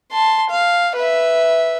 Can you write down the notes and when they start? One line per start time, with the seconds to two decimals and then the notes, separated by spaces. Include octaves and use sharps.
0.12 A5 C6
0.50 F5
0.96 B4 E5